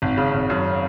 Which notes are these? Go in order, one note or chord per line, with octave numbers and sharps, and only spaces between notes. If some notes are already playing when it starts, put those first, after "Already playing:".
G#1
C#3
G#1
F#2